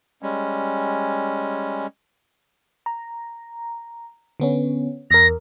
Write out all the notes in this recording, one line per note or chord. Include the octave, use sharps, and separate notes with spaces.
G3 G#3 C#4
A#5
D3 B3 C#4
E2 A#4 A#6